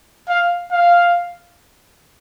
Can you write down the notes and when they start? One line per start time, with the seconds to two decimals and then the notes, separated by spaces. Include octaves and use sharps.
0.29 F5
0.72 F5